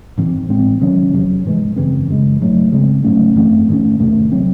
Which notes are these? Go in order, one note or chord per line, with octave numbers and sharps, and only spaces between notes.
G#2 E3 C4
A2 G#3 C4
C3 D#3 F#3 C#4
E2 C3 F#3
G#2 E3 G#3
F#2 C#3 E3 C4
F#2 C#3 G#3
G#2 F#3 A3
C#3 G#3 C4
G#2 F#3 A3 C#4
F#2 E3 A3 C4
G#2 D#3 A3 C#4
E2 C3 D#3 A3
F#3 C4